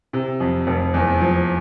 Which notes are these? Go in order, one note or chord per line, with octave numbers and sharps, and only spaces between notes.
C3
F2
F1
E2
F3